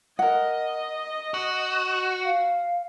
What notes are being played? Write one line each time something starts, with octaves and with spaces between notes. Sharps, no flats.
A#4 D#5 F#5
F#4
F5